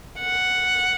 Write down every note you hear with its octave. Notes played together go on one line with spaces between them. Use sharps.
F#5